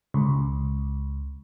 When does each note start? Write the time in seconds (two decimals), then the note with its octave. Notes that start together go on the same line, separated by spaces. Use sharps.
0.14 C#2